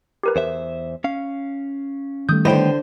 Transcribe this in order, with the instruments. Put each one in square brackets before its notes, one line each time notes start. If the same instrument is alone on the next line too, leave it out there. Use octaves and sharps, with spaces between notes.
[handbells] G4 A#4 B4
[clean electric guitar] E2 C5 E5
C#4 F5
[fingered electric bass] D#3 G3 A3 [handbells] D#6 G6
[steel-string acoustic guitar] D3 C5 [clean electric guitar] B3 C#5 G5 [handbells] E4 D#5 B5